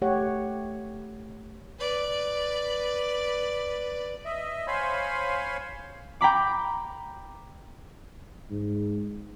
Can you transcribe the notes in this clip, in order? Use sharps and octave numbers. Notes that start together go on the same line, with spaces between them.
A3 G4 C#5 F#5
B4 D5
D#5 E5
C5 C#5 F5 G#5 B5 C6
G5 A#5 B5 D6
G#2